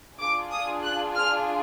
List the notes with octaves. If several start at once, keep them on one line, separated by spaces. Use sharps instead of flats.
D4 F4 G#4 D6
D#6
F#6
F6